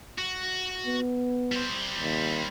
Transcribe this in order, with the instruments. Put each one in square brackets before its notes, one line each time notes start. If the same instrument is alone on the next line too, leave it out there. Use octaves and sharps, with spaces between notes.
[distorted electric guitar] F#4
[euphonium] B3
[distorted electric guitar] G3 C5
[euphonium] D#2